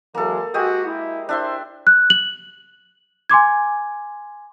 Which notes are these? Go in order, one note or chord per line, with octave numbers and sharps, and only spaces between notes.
E3 F#3 G#3 A#3 A4
G#3 F#4 G4 D#6
E4
D4 E4 C5 E5 C6
F#6
F#7
G#5 C6 D6 G#6